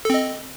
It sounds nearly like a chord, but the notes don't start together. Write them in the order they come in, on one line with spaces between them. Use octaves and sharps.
A4 C4 D#5